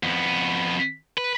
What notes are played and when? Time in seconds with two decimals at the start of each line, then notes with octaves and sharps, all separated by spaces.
0.03 F2 B3
1.18 B4